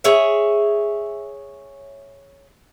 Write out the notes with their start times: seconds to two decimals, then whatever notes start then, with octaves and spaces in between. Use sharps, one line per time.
0.04 G#4 C#5 E5